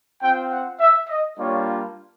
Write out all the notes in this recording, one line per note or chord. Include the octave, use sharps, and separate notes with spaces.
C4 F4 G5
F#5
E5
D#5
G3 A#3 D4 F4 C#5